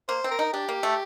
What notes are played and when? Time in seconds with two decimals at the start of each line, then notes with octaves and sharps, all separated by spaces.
0.08 A#3 C5
0.24 C4
0.31 A#4
0.39 D#4
0.53 D4 G4
0.69 A#3
0.83 A3